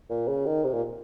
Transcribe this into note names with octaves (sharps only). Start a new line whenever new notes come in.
A#2
C#3
D#3
C3
A#2